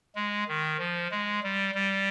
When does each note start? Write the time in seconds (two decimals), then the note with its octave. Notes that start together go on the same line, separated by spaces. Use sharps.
0.16 G#3
0.48 D#3
0.79 F3
1.11 G#3
1.43 G3
1.75 G3